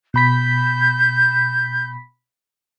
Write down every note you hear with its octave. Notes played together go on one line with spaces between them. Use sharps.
B2 B5 G6 B6